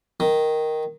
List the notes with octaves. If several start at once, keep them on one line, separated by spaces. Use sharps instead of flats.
D#3